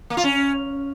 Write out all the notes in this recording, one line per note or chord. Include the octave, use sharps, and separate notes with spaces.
A#3
F4
C#4